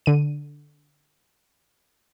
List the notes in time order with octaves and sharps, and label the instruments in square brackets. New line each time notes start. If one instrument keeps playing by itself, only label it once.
[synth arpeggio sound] D3 D#7